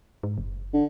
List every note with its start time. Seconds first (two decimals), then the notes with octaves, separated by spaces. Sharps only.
0.23 G#2
0.38 F#1
0.74 D3